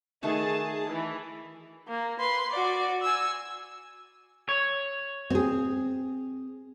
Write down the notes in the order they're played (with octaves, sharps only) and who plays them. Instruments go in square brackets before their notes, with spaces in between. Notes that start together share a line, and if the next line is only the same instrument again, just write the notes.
[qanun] D#3 A3 F#4 [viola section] G#4 A5
[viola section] E3
[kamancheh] A#3
B4 C6
F#4 D5
G#5 E6
[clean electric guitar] C#5
[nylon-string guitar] C4 G#4